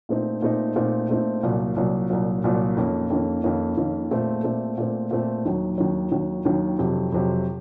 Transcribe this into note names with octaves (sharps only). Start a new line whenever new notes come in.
A#2 A3 C4 D#4
A#2 A3 C4 D#4
A#2 A3 C4 D#4
A#2 A3 C4 D#4
C2 A#2 F#3
C2 A#2 F#3
C2 A#2 F#3
C2 A#2 F#3
F2 D#3 A#3 C#4
F2 D#3 A#3 C#4
F2 D#3 A#3 C#4
F2 D#3 A#3 C#4
A#2 A3 C4
A#2 A3 C4
A#2 A3 C4
A#2 A3 C4
D#2 D#3 F#3
D#2 D#3 F#3
D#2 D#3 F#3
D#2 D#3 F#3
F2 C3 F#3
F2 C3 F#3